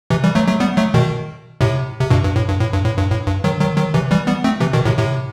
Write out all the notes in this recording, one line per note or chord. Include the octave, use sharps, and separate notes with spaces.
C3 E3
E3 G3
F#3 A3
F#3 A3
G3 B3
F#3 A3
B2 D#3
A2 C3
C3
G2 B2
G2
A2
G2
A2
G2
A2
G2
A2
G2
D#3 F#3
D#3 F#3
D#3 F#3
C3 E3
E3 G3
G3 B3
A3 C4
C3 E3
B2 D#3
A2 C3
A2 C3